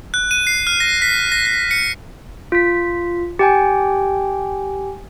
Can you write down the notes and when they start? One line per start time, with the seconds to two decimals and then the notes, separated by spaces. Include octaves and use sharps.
0.14 F#6
0.31 D#7
0.47 C7
0.67 F6
0.80 A#6
1.02 B6
1.32 A#6
1.46 A#6
1.71 C#7
2.52 F4 B6
3.39 G4 G5 G#5